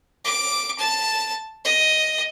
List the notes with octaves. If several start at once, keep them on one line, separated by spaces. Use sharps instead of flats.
D6
A5
D#5